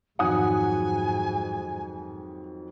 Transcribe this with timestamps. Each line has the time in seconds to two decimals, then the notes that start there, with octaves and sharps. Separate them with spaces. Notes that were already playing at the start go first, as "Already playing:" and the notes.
0.19 F2 G#2 D#3 F#3 F#5 G#5 D#6